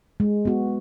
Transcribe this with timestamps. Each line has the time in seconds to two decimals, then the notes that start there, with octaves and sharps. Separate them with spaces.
0.20 G#3
0.45 B3 F#4